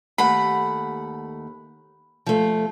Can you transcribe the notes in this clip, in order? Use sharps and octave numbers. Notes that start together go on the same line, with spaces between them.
D#2 A3 F#5 B5
F3 A3